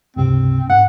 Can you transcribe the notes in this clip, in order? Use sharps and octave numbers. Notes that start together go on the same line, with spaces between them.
C#2 G2 C3 C4
G#2 F#5